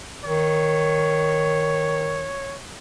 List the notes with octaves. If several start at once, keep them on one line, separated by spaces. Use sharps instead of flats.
D#3 C#5